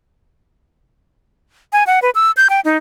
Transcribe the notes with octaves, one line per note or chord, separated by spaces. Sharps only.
G#5
F#5
B4
E6
G6
G5
D#4